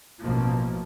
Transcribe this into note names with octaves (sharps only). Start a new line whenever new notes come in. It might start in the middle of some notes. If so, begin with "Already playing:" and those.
A1 B2 F3 A#3